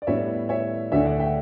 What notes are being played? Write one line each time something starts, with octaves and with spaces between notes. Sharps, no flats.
D5
A2 G3 B3 D4 C#5 E5
C#5 E5
D2 D3 A3 D4 C#5 E5
D5 F#5
E5 G5